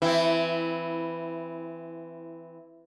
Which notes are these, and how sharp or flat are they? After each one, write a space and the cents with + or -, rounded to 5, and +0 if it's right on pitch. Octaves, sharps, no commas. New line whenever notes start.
E3 +15 C4 -10 E4 +0